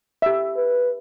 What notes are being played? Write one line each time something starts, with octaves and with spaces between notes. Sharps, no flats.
G4 E5
B4